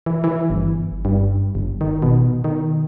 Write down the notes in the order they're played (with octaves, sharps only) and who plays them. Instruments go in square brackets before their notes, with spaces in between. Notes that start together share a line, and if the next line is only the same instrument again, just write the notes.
[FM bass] E3
E3
G1
G2
G1
D#3
B2
D#3